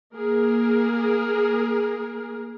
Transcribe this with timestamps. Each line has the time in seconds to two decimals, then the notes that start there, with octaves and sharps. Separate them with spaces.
0.15 A#3 G#4 A#4